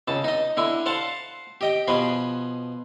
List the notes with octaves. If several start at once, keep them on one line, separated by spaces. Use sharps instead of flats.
C#2 C#3 A5
D#4 D#5
D3 E4 G#5
C5 F5 F#5 A5
G4 D#5 G5
B2 F3 G#4 B4